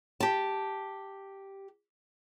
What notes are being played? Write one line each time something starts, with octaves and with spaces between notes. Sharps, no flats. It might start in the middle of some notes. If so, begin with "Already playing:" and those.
G4 A5